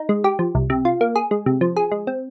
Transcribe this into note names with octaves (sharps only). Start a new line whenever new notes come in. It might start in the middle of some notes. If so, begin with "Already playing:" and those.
Already playing: D#4
G#3
G4
F3
C2
C3
F4
A#3
G#4
G#3
C3
F3
G#4
G#3
C4